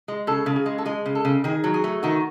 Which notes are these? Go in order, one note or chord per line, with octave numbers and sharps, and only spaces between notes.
G#3
C#3 A4
C#3
G#4
G#3
A4
G#3 G#4
C#3
A4
C#3
D#3 G#4
F#3
G#4
A3
D#3 F#4